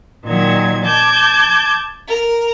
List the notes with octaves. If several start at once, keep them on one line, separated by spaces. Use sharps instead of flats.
A#2 D#3 F#3 G#6
A5 D6 G6 G#6
A#4